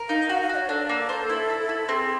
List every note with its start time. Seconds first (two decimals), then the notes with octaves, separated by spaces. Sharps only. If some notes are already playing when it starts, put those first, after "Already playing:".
Already playing: A#4
0.09 D#4 F5
0.28 F#4 F5
0.42 F5
0.49 F#4
0.55 C#5
0.69 D4 A4
0.89 A#3
1.09 C5
1.30 E4
1.50 E4
1.69 E4
1.89 C4 G#4